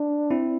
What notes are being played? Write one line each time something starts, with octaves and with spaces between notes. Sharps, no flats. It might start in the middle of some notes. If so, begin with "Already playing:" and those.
Already playing: D4
C4 E4